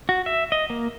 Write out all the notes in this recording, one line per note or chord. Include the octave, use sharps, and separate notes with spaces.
F#4
E5
D#5
A#3